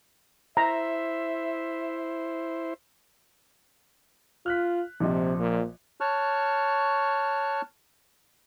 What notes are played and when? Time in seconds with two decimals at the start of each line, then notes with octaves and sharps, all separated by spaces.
0.57 E4 C5 E5 A#5
4.46 F4 F6 F#6 B6
5.00 A#1 C3 F3 D#5
5.40 A#2
6.01 C#5 A5 C#6 F6 F#6